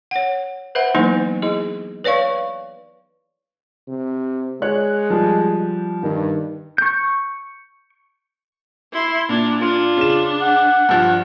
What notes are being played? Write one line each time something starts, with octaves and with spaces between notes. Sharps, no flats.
C#5 F#5
B4 C5 E5 F#5 B5
E3 F#3 A#3 B3 D#4 E4
E4 G#4 D#5
B4 C#5 D5 F5 C#6
C3
G#3 C#5 F#6
F3 G3
G2 D#3
C#6 G6
E4 C6
A#2 D4
D4 F4
C#3 E7
F#5
G2 F3